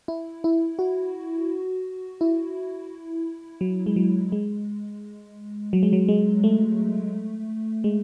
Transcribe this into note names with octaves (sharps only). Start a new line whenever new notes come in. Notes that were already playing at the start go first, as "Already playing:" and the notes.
E4
E4
F#4
E4
F#3
G#3
F#3
G#3
F#3
G#3
F#3
G#3
A3
G#3